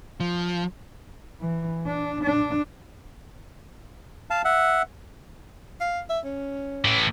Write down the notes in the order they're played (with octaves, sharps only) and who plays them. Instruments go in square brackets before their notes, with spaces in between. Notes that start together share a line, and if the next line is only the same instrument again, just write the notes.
[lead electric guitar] F3
[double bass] E3
D4
D4
[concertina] F5 A5
E5 F#5
[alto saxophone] F5
E5
C#4
[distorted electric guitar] A2 E3